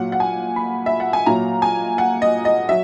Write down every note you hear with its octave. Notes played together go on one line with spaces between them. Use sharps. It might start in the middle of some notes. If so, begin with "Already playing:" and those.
Already playing: A#2 F#3 F#5
F#5
G#5
B5
E5
F#5
G#5
A#2 F#3 A#5
G#5
F#5
D#5
D#5
F#3 E5